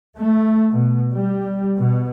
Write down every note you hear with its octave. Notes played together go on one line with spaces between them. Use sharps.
A3
B2
G3
B2